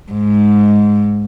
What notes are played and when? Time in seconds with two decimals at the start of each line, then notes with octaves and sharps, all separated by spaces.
0.12 G#2